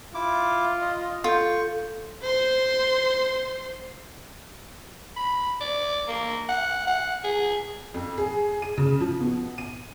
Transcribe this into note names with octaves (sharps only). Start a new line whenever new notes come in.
E4 F4 D6
D#5
F4 A4 C#6 G6
C5 C6
B5
D5
A#3
F#5
F#5
G#4
F2
G#4
D#7
C#3
F3
B2
D#7